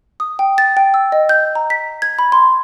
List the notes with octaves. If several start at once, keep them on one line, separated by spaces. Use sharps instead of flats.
D#6
G5
A6
G5
E6
D#5
G6
A#5
B6
G#6
B5
C6